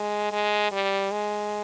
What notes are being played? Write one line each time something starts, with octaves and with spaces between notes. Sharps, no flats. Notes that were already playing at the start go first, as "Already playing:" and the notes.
Already playing: G#3
G#3
G3
G#3